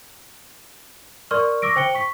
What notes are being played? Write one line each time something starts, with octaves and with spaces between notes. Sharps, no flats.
A#4 D5 C6 C#6 F6
C#6 D6 E6 A#6 D7
C5 G5 C#7 G7
C#6 B6